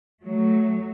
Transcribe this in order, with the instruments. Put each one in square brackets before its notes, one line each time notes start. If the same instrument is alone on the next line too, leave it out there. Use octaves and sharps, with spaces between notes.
[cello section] F#3 A3